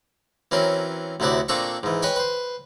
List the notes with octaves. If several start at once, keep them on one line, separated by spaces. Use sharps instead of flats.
E3 F#3 C4 C#4 A#4
D2 C3 F#3 E4 F#4 D5
A#2 C4 D4 A4 A#5 C#6
G#2 E3
B4 C#5 D#5 G5 G#5
B4 C5